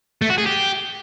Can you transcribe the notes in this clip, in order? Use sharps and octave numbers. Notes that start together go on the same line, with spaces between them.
A3
F#4
G#4
G4